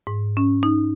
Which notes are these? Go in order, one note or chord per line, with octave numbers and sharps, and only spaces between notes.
G#2
C#4
D#4